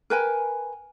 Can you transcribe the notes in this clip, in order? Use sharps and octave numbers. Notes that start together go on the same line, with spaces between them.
A#4 B4 G5 G#5